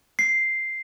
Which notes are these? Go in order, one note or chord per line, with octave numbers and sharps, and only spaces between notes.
C7